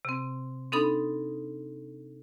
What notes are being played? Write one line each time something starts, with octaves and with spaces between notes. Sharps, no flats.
C3 C4
C4 D4 D#4 A4 B5 D#6